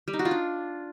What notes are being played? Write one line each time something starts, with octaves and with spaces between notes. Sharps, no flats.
G3
D#4
F#4
F4
D4